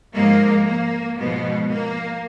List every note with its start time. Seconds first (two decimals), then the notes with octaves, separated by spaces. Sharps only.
0.14 G#2 F3 G#3 A#3
0.66 A#3
1.18 G#2 B2 F3 G#3 B3
1.69 A#3